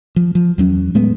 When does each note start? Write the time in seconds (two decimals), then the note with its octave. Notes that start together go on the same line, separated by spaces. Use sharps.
0.16 F3
0.35 F3
0.58 E2 F#3 C#4
0.95 A2 G#3 A3 B3